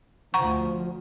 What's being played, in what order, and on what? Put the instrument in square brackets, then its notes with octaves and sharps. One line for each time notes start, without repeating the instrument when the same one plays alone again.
[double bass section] D2 F3 [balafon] F#5 A#5 C#6